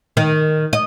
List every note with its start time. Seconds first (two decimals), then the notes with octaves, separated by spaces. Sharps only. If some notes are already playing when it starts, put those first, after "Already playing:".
0.17 D#3
0.73 D#5